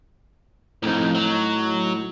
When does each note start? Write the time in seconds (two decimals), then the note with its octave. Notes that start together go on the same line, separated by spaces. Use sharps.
0.83 C2 F2 A2 D#4
1.15 F#3